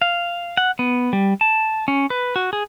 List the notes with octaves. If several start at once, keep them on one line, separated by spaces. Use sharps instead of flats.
F5
F#5
B3
G3
A5
C#4
B4
F#4
G#4